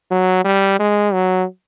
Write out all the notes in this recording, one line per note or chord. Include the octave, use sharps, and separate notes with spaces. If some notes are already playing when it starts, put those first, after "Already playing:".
F#3
G3
G#3
F#3